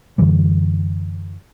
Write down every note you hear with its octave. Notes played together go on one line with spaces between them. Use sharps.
F#2 D3 E3 G3